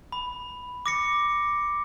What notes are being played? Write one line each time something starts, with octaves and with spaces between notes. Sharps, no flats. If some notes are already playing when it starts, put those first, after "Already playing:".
B5
D6 A#6 C#7